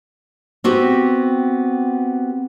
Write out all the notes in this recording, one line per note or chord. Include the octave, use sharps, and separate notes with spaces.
B3 C4 F#4 G4